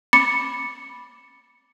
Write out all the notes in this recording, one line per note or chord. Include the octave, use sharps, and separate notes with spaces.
B5 D6 A6 C#7